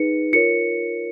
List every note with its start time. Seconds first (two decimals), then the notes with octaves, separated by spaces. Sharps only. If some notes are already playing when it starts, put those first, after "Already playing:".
Already playing: D#4 G#4 B4 C#7
0.33 F4 A#4 C#5 C#7